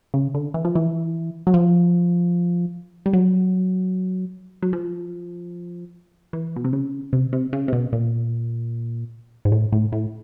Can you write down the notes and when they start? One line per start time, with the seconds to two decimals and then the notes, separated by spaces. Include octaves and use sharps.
0.14 C#3
0.34 D3
0.54 E3
0.65 F3
0.75 E3
1.47 F#3
1.54 F3
3.06 G3
3.13 F#3
4.63 F#3
4.73 F3
6.33 E3
6.56 B2
6.64 C3
6.73 C#3
7.13 C3
7.33 C3
7.53 C#3
7.68 C3
7.73 B2
7.93 A#2
9.45 G#2
9.52 A2
9.72 A2
9.92 A2